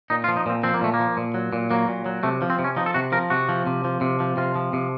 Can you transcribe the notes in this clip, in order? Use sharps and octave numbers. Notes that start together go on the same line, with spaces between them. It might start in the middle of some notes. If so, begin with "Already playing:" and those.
A#2 D#4
F4
F3
D#4
A#2 C4
F3 C4
A#3
A#2 A3
A#3
F3
A#2
F#3
A#2
F#3 A#3
A#2
F#3
C3 A3
F3
C4
C3
C#4
F3 D#4
A4
C3 F#4
F3 A#4
C3 F#4
F3
C3
F3
C3
F3
C3 F4
F3
C3